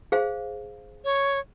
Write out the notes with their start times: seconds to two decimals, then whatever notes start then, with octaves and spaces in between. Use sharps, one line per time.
0.12 G#4 C5 F5
1.05 C#5